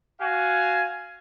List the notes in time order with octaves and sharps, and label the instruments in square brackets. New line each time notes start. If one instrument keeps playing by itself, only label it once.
[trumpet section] F#4 F5 G#5